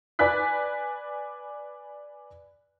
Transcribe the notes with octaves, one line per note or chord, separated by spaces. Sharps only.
B4 D5 G#5 B5 F#6 B6